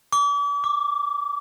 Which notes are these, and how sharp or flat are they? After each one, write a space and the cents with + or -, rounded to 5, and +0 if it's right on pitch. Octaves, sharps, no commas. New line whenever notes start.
D6 -40
D6 +0